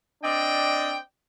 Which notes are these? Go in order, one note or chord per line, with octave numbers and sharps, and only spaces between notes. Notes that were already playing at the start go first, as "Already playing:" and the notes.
C4 D4 D5 D#5 G5